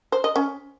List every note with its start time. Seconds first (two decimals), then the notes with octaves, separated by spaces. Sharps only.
0.12 C5
0.24 D#5
0.36 C#4